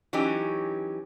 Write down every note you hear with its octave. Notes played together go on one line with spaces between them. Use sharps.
E3 F#3 C#4 D#4 G4